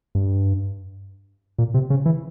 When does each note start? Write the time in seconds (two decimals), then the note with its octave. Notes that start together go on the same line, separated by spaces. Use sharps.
0.15 G2
1.58 A#2
1.74 C3
1.90 C#3
2.06 E3